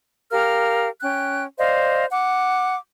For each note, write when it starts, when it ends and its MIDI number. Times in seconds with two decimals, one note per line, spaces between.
0.31 0.88 67
0.31 0.88 70
0.31 0.88 77
0.31 0.88 89
1.01 1.43 61
1.01 1.43 79
1.01 1.43 90
1.59 2.05 72
1.59 2.05 74
1.59 2.05 75
1.59 2.05 77
2.11 2.75 78
2.11 2.75 86